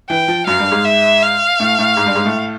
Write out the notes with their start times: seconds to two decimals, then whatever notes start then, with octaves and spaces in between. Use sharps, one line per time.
0.10 E3 G5
0.28 F3
0.47 F#2 F#3 F5
0.60 G2 G3
0.72 G#2 G#3
0.85 E5
1.23 F5
1.60 A2 A3
1.78 A2 A3
1.97 G#2 G#3
2.06 G2 G3
2.15 G#2 G#3
2.25 A2 A3